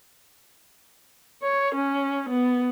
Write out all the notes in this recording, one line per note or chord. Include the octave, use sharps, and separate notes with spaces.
C#5
C#4
B3